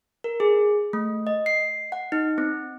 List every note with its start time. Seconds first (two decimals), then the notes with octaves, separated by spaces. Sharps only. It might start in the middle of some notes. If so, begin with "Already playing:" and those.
0.24 A#4
0.40 G#4
0.93 A3
1.27 D#5
1.46 C7
1.92 F#5
2.12 D#4
2.38 C4